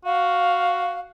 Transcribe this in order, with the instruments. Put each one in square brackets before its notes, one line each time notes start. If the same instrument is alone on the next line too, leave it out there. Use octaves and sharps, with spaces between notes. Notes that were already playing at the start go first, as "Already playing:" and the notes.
[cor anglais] F#4 [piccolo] F5